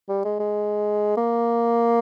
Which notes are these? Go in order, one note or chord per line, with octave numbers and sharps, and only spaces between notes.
G3
G#3
G#3
A#3